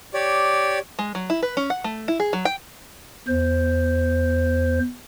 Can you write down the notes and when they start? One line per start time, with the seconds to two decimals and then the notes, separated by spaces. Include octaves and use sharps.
0.14 G4 C#5 D5
0.99 G#3
1.15 F#3
1.30 E4
1.43 B4
1.57 C#4
1.70 F#5
1.84 A3
2.08 E4
2.20 G#4
2.33 F#3
2.45 G5
3.28 E2 C5